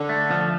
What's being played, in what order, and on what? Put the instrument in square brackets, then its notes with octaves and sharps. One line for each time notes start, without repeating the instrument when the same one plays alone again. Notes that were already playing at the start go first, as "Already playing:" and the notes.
Already playing: [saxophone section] D3
[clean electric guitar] A3
F3